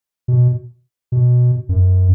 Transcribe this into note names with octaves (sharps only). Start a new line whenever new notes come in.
B2
B2
F#2